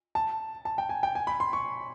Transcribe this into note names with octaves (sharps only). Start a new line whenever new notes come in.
A5
A5
G5
G#5
G5
G#5
B5
C6
C#6